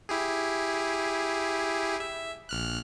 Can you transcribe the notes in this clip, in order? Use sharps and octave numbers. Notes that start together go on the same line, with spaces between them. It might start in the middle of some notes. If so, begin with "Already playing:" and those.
E4 G4 G#4
E5
A#1 F6 F#6